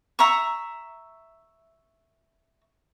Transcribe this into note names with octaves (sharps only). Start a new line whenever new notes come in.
E5 A#5 C#6